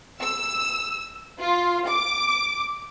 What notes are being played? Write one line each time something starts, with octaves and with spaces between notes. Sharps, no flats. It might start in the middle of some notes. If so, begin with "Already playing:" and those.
E6
F4
D6